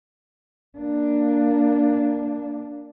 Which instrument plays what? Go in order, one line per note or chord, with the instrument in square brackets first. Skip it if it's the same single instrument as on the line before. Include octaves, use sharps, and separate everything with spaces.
[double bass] A#3 D4